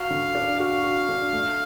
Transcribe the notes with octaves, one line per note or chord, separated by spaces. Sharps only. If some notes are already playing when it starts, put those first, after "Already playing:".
Already playing: F#4 F5
D3
D4
F#4 F5
F#4
D4
A3